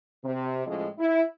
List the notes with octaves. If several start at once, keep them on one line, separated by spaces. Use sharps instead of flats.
C3
A2 F3 G#3 C#4 D#5
E4